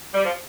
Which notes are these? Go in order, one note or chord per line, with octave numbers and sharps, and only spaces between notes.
G3
F3